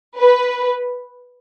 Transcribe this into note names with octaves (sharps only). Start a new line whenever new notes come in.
B4